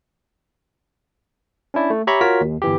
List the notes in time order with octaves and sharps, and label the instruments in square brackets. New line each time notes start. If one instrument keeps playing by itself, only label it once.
[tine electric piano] C#4 D4 E4 D5
A3
G4 C#5 E5 A#5 B5 C#6
F4 F#4 A#4 C#5 B6
D#2
G1 E3 G4